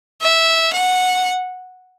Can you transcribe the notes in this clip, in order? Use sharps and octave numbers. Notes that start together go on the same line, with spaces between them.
E5
F#5